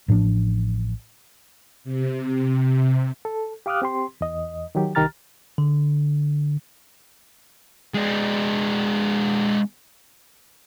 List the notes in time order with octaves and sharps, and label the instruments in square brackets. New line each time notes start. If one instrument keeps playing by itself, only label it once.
[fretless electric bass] A1 A2 F3 D4
[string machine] C3
[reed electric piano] A4
G4 F5 D6 D#6 F6 F#6
C4 G4 C6
E2 D#5
D#3 F#3 G4
C2 D#3 G4 A#5 F6 A6
[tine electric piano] D3
[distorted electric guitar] G#3 D4